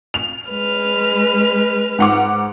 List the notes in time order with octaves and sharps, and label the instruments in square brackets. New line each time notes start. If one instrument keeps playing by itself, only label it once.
[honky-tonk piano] F7
[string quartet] G#3 B4 F6
[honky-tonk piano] G#2 F#5 D6